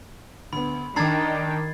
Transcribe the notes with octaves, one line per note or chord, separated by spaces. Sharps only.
D2 B3 B5
D#3 D4 G5 A#5 D6 G#6 A6 C7